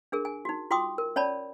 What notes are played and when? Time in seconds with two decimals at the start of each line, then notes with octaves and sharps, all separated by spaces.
0.12 D4 G#4 A#4
0.25 G#5
0.45 D#4 F#4
0.71 F4 F#4 G5 C6 D6 D#6
0.98 A#4
1.16 C#4 C#5 D5 A5 B5